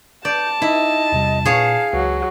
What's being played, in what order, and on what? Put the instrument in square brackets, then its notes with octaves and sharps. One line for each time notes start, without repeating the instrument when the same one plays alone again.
[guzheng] D5 [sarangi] A5 [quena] G6
[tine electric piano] D#4 [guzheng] E4 [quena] D#5
[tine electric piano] E2 C3 G3
[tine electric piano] A#2 [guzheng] G#4 C#5 [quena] F5
[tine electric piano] C#2 [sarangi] F#3